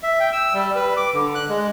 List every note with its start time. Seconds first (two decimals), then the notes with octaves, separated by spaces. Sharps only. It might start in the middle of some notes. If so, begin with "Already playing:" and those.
0.03 E5
0.20 G5
0.33 E6
0.53 G3
0.75 B4
0.97 D6
1.14 D3
1.35 F#6
1.49 G#3